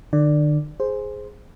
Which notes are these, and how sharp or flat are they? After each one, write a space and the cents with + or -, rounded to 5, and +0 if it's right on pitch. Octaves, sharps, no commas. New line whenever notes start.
D3 +40 D5 +0
G#4 +0 C5 +0